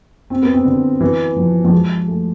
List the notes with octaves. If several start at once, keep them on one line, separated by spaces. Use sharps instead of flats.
C4
B3
C4
D3
E3
F3
F3
G#3
A3